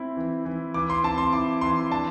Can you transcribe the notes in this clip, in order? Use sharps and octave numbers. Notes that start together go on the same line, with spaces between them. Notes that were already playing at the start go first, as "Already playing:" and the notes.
Already playing: C4 E4
E3
E3
E3 D6
C6
C4 A5
C6
E4 D6
E3 C6
D4 A5